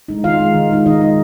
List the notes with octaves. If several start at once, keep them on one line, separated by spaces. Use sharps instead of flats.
G#3 D#4
D#3 F4 F5
G#3 D#4
D#3
G#3 D#4
D#3 D#4 D#5
G#3 D#4